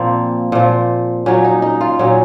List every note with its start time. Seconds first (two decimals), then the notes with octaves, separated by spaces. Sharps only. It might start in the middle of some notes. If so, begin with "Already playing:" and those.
Already playing: A#2 F3 A#3 C4
0.52 A#2 F3
1.26 A#2 F#3 C#4
1.44 D#4
1.62 D#4
1.81 F4
1.99 A#2 F#3 C#4